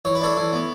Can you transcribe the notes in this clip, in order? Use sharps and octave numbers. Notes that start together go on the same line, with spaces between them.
E3 C#5
B4
D4 A4 C#5
E3
B3